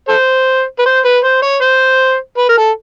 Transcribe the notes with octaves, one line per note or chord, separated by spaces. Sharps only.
A4 C5
B4
C5
B4
C5
C#5
C5
B4
A#4
A4